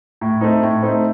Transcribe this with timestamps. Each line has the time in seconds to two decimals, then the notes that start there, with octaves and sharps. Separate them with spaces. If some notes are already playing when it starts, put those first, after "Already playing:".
0.21 A2
0.41 A3 C4 D#4
0.63 A2
0.83 A3 C4 D#4